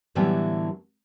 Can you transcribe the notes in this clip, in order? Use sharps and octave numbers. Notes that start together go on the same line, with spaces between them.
A2 D3 E3 F#3 G3 B3